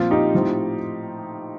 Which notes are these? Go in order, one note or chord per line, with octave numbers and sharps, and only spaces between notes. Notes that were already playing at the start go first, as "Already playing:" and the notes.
Already playing: A#2 F3 C4 F4
D#4 G4
A2 F3 C4 D#4